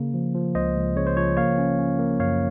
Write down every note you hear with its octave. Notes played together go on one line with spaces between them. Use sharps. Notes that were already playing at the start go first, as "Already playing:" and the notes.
Already playing: C#3 A#3
F3
F3
C#2 C5 D#5
C#2
C#3 C#5
C5
F3 C#5
A#3 C#5 F5
C#4
C#4
A#3
F#2 C#5 F5